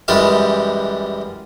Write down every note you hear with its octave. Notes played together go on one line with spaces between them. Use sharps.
F#2 E3 G3 G#3 G4 F5